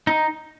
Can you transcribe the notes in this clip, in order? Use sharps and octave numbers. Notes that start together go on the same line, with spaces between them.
D#4